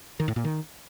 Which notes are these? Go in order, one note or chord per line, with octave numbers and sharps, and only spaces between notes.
D#3
A2
A#2
D#3